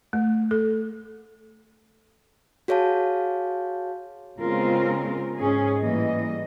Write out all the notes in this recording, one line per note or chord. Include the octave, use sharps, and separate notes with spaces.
A3
A4
F#4 G#4 C#5 F5 A5
C#3 G#3 B3 C4 F4 A#4
G#2 C#4 G#4
A2 E3 G3 A#3 D#5